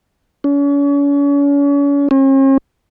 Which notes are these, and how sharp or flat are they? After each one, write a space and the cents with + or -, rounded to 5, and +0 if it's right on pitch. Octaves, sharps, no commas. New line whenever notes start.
C#4 +40
C#4 -45